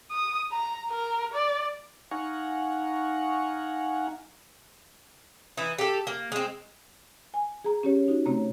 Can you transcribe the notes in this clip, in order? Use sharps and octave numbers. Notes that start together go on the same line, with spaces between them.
D#6
A#5
A#4
D5
D#4 F5 F#5 G#5 A#5 C#6
E3 D#4 E4
G4 A4
A#3
G#3 C4
G#5
G#4 A#5
C#4 G4 C#5
D#4 F#4
C3 A3 C4 C#5 A#5